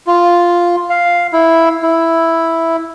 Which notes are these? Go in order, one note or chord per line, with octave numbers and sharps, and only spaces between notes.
F4
F5
E4
E4